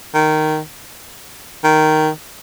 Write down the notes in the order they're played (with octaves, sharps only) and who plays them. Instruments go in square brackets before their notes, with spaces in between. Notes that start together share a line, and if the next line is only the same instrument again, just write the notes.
[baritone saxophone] D#3
D#3